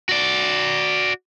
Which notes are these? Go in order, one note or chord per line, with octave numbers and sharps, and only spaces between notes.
F#4 D5